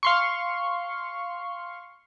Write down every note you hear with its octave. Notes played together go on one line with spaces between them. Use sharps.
F5 C6 C#6